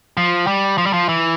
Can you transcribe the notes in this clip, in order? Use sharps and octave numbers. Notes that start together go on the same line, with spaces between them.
F3
G3
F3
G3
F3
E3